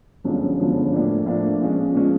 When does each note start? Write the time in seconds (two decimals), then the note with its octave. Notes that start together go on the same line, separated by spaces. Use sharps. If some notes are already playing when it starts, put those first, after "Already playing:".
0.24 G1 F#2 D3 F3 G#3
0.59 G1 F#2 D3 F3 G#3
0.93 A2 F3 A#3 D4
1.26 A2 F3 A#3 D4
1.61 A#2 F3 G#3 C#4
1.95 A#2 F3 G#3 C#4